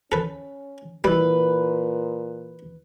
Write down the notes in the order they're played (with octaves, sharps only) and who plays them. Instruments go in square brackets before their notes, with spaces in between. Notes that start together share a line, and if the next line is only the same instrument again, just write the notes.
[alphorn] C#4 [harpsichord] A4 B4
[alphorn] A#2 [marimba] E3 E4 [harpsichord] G3 [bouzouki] B4